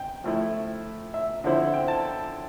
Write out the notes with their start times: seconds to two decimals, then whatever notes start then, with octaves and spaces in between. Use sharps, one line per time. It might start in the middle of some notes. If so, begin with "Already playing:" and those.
Already playing: G5
0.24 F3 A3 E4
1.14 E5
1.44 D3 F3 C4 E4
1.73 G5
1.88 A5